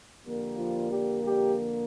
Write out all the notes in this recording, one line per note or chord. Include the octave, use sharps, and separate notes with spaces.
F2 D3 G3 A#3
F3 F4
G3 G4
G3 G4